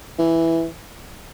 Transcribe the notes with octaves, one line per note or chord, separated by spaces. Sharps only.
E3